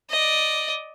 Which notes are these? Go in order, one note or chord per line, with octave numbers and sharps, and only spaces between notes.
D5 D#5